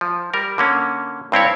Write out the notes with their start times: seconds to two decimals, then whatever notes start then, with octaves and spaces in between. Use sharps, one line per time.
0.01 F3
0.34 G3 A#4
0.58 D3 A#3 C#4
1.32 G2 C4 E4 C#5